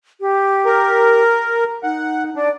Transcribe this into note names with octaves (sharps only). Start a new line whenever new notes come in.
G4
A#4
D#4 F#5
D4 D5